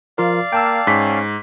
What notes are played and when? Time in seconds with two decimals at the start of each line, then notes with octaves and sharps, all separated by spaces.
0.18 F3 F4 A#4 D5 F5
0.53 A#3 G5 A5 E6
0.87 G#2 C#4 B6